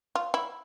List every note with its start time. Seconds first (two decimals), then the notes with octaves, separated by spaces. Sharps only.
0.15 F4
0.34 E4